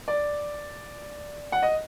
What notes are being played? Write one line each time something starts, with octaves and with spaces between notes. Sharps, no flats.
D5
F#5
D#5